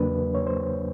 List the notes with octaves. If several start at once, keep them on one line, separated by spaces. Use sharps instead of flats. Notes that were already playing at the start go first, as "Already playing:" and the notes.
Already playing: E2 C#3 F#3 A#3 D4 B4
C#5
C5